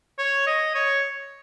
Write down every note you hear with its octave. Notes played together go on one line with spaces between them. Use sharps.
C#5
D#5
C#5